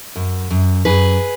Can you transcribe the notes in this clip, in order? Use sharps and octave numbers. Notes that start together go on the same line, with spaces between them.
F#2
F#2
F#2 G#4 B4